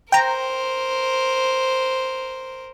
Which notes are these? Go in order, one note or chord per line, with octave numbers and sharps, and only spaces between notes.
A#4 C5 G5 A#5